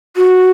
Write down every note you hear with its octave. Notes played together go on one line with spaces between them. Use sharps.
F#4